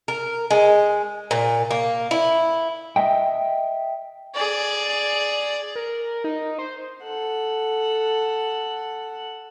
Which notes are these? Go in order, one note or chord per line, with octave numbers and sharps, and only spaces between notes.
A#4
G#3
A#2
A#3
E4
D#5 E5 G5
G#4 D5
A#4
D#4
C5
A4 F#5